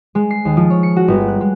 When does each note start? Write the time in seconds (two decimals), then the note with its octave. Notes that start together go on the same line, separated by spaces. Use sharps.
0.15 G#3
0.31 C7
0.45 D#2
0.57 F3
0.70 C#5
0.83 C#7
0.96 F#4
1.08 G1
1.28 F#6
1.41 G#3